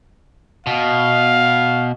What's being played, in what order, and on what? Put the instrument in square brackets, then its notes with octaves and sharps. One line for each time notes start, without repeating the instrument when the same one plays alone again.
[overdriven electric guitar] B2 [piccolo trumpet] F5